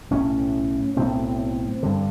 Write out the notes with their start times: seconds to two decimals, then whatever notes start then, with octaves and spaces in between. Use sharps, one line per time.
0.11 B1 A2 C#4
0.96 B1 A2 C4
1.83 G2 D3